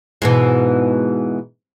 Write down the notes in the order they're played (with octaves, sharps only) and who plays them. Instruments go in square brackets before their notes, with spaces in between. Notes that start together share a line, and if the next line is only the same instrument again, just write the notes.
[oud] G#2 B2 E3